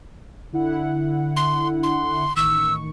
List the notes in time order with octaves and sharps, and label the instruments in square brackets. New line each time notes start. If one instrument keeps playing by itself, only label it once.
[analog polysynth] D3 E4 F#5
[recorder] C6
C6
[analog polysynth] A1 D#3 C#6 [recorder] E6